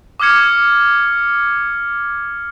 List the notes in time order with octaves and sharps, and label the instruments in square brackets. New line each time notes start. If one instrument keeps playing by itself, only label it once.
[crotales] D6 D#6 F6 G#6 C#7